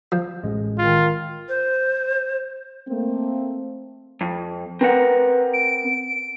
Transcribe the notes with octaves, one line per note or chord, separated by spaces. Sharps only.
F3
A1 G#3
D#3 F4
C5
A3 A#3 C4
F2
C4 A#4 B4 F#5
D7
D7